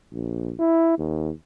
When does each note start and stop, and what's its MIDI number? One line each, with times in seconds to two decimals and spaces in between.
0.12 0.53 34
0.59 0.98 64
0.98 1.30 39